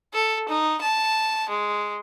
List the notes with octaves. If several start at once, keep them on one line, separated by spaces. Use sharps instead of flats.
A4
D#4
A5
G#3